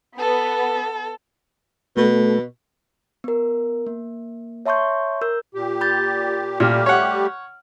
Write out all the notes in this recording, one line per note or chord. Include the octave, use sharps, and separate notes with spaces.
B3 A4
B2 A3
B3 A#4
A#3
C#5 E5 A5 C6 C#6 G6
A#4 E6 G6
A#2 G4
B5 G6 A6
A#2 G3 A3 G4 F6
C#5 F#5